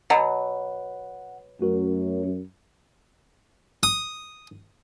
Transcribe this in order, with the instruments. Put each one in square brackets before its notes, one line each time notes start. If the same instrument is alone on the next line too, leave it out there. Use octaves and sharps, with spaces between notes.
[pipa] B2 F#3 [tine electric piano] F#5
[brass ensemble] F#2 [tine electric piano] A3 F#4 A#4
[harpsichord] D#6